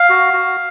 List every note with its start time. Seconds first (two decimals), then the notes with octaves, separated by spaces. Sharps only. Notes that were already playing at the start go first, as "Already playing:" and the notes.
Already playing: F5
0.09 F#4
0.33 F#4